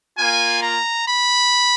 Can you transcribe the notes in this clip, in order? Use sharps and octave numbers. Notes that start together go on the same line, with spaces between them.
A#3 F4 G#5
A#5
B5